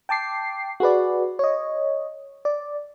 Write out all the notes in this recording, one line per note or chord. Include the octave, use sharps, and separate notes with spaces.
G5 A5 D6 C7
F#4 G#4 B4 D5
C#5 D#5
D5